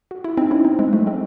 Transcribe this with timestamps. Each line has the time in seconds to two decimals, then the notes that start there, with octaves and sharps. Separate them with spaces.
0.11 F#4
0.24 E4
0.37 C4 D#4
0.51 C#4 E4
0.65 C4 D#4
0.79 G#3 C4
0.92 F#3 A3
1.06 G#3 C4